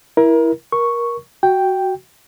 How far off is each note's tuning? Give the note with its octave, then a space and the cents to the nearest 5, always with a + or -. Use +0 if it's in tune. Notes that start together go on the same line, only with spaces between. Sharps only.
E4 +0 A#4 +25
A#4 +20 C#6 +0
F#4 +10 G5 +0